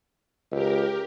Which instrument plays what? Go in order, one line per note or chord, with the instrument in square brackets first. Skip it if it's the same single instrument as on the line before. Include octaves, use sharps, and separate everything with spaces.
[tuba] C#2 [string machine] G4 A#4